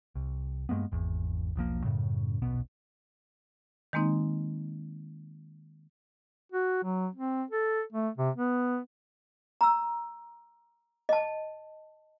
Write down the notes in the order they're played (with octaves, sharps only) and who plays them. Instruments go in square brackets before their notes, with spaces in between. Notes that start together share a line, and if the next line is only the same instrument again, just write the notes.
[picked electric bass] C2
G2 G#3 A#3 B3
G#1 E2
E1 B1 F3 A#3
F#2 A2 C#3
D#1 B1 B2 B3
[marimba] D#3 G#3 A#3 C4 D#4
[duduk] F#4
F#3
C4
A4
A3
C3
B3
[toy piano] A#5 E6
D#5 A5